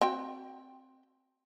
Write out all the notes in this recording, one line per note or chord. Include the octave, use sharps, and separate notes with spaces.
C4 F#4 G5